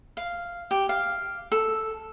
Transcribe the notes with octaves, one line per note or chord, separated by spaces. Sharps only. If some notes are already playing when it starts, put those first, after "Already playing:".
F5
G4
F5
A4